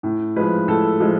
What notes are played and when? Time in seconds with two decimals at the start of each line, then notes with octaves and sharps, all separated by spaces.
0.03 A2
0.36 F3 G#3 B4
0.68 A2 A4
1.00 F3 G#3